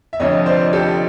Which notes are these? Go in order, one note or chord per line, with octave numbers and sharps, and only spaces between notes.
E5
F1 F2 D3 F3 C#5 D#5
C5 D5
G4 A4